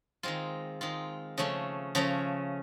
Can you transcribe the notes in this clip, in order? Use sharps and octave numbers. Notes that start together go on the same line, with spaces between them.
D#3 G#3 C4 F4
D#3 G#3 C4 F4
C#3 F3 A3 C#4
C#3 F3 A3 C#4